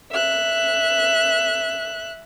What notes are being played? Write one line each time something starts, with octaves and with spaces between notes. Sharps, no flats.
E5 F#6